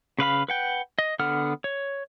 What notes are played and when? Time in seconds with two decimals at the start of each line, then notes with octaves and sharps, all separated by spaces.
0.19 C#3 B4 F5 B5
0.48 B4 F#5 G5
0.99 D#5
1.19 D3 B3 A4 F#5 F6
1.64 C#5